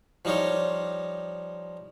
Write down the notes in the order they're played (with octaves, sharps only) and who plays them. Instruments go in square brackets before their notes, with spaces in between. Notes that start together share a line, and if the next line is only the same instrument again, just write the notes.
[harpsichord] F3 G3 D#4 F4 C#5